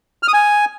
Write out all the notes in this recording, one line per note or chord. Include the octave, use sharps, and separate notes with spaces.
F6
D#6
G#5